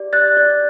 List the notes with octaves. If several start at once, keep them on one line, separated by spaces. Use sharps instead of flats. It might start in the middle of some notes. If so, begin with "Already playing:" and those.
Already playing: G4 D5
D5 F#6 A6
D5